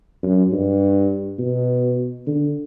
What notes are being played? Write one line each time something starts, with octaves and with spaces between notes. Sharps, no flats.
F#2
G2
B2
D3